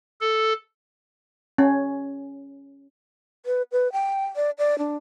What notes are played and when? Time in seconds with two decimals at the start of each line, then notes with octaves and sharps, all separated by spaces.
0.21 A4
1.58 C#4
3.46 B4
3.72 B4
3.93 G5
4.36 D5
4.58 D5
4.78 D4